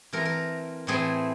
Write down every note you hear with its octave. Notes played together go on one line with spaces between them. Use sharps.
E3 A3 C4 A#4
A#4
A2 E3 A3 C4 G#4